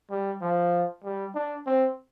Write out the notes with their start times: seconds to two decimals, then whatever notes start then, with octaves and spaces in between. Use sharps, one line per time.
0.10 G3
0.41 F3
1.04 G3
1.35 D4
1.66 C4